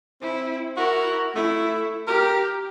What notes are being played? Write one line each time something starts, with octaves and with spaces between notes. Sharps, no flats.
C4 E4
E4 F#4 A#4
A3 E4
G4 A#4